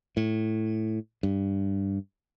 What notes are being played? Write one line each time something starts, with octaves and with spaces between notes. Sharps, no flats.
A2
G2